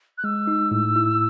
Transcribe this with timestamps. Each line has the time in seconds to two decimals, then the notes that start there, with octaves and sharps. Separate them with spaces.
0.18 F#6
0.24 G#3 E6
0.47 D#4
0.71 A2
0.96 E4